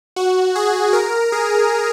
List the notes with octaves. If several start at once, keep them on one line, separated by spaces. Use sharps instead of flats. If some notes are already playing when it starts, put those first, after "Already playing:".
F#4
G#4
A#4
G#4